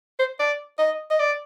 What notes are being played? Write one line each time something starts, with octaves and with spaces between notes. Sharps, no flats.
C5
D5
D#5
D#5
D5